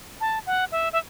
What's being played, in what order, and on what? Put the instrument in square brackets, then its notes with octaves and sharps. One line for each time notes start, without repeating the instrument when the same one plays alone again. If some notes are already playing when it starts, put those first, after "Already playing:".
[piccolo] A5
F#5
E5
E5